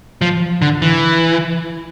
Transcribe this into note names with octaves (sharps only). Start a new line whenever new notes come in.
F3
D3
E3